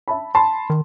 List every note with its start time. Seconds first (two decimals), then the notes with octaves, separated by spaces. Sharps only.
0.08 E5 A5 B5
0.35 A5 B5 C6
0.70 D#3